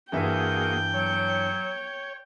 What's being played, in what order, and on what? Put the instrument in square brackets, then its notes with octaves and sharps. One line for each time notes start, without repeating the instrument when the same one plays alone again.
[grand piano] G2 E3 E5 [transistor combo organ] A#3 F#4 G#4 [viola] G5
[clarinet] F#3 [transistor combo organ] C#5